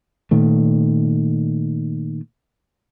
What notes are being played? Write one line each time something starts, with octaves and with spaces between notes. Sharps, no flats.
A#2 D#3 A3